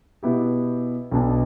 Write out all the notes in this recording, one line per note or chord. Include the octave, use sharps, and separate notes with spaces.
B2 B3 E4 G4
B1 B2 B3 D4